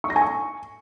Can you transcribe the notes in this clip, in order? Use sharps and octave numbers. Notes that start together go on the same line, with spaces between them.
C#6
A#6
G#5
C#6